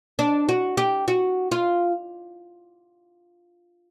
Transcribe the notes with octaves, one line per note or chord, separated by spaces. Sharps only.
D4
F#4
G4
F#4
F4